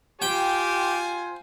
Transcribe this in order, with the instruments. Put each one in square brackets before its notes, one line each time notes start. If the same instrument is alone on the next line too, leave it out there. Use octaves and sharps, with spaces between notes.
[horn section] F4 C5 G#5 [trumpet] G4 [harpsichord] G5